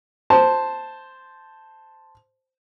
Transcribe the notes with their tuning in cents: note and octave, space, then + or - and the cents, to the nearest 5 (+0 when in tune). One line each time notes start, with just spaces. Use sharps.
C5 +0 A5 +0